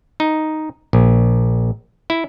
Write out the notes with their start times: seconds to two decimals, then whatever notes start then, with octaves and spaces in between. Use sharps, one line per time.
0.20 D#4
0.93 A#1
2.10 E4